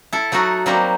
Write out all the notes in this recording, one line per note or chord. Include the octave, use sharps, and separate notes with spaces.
E4 A4
F#3 A3 D#4 F#4 A4
F#3 G3 A#3 C4 G4 A#4